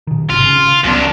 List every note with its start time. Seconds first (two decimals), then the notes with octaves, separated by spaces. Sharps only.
0.07 B2 D#3
0.30 G#1 C3 F4
0.45 C#3
0.84 C#2 F#2 B3 D4